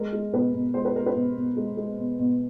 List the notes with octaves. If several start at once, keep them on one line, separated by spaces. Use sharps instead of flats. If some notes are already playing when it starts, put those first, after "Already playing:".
Already playing: G#3 A#4
G#3
B2 B4
B2
G#3 C5
B4
G#3 A#4
B4
B2
B2
G#3
G#3
B2
B2